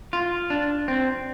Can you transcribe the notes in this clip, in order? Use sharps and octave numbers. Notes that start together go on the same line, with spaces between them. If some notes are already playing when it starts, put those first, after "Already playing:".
F4
D4
C4